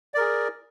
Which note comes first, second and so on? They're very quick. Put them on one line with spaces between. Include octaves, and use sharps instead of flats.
D5 A#4 G#4